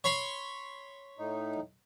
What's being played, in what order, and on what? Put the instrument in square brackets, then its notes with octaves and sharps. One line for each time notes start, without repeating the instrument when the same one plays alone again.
[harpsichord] C#5 B5 C6
[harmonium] A2 D#4